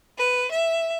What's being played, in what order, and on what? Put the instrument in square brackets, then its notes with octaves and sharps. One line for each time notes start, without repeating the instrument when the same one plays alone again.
[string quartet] B4
E5